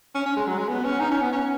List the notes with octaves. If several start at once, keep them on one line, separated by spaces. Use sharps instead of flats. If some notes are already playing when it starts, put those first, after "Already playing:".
C#4
C#4
G#3
F#3
G#3
B3
C#4
D#4
C#4
B3
C#4